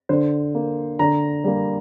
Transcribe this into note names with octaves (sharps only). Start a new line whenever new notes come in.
D3 C5
A#3
D3 A#5
G3 A#3